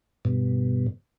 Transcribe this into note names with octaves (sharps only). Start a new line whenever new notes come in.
G2 B2